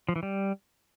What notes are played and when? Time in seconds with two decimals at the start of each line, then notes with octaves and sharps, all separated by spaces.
0.09 F3
0.16 E3
0.23 G3